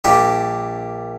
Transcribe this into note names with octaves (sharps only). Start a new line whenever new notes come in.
A#1 A#2 G3 D4 G4